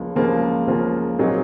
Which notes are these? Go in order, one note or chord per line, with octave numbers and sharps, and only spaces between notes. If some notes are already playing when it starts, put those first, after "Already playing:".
Already playing: C#2 C#3 F3 A#3
C#2 C#3 F3 A#3 F4
C#2 C#3 F3 A#3 F4
A#2 F#3 C4 D#4 G#4